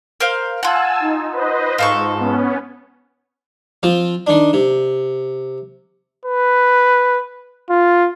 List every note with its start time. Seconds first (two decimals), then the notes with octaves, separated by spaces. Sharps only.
0.20 A#4 C5 F5
0.63 F4 F#5 G#5 A5 E6
1.00 D#4
1.32 B4 C5 D#5
1.78 G#2 F4 A4 C#6
2.19 B3 C#4
3.83 F3 C4 F4
4.27 D#3 D4
4.53 C3
6.25 B4
7.70 F4